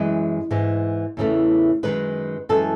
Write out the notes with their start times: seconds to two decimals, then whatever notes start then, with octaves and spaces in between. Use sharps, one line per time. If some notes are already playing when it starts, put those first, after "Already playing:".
Already playing: F#2 E3 G#3 D#5
0.51 G#2 E3 G#3
1.17 E2 C#3 E3 A3
1.83 F#2 D#3 G#3 B4
2.49 F#2 E3 G#3 A4